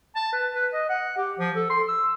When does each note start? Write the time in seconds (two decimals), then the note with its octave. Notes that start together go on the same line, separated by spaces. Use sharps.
0.16 A5
0.33 B4
0.55 B4
0.73 D#5
0.89 F#5
1.18 G4
1.39 F3
1.56 A4
1.70 C6
1.88 E6